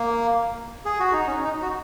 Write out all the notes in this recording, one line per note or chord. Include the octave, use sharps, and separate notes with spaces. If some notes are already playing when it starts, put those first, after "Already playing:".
Already playing: A#3
G#4
F#4
D#4
C#4
D#4
F#4